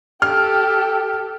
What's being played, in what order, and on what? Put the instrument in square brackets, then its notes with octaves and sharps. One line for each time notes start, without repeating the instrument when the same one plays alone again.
[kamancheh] G4 A4 [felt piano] F6